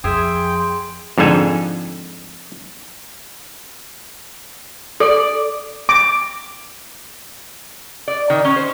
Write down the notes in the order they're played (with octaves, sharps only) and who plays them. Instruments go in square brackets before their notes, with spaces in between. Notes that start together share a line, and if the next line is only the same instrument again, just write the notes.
[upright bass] F2 [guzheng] G#4 E5 [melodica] G5 [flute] C6
[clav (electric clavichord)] F2 G#2 D3 A4 G#5
[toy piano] A4 [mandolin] D5
[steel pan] D6
[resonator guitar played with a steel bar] D5
D#3
C#4
C5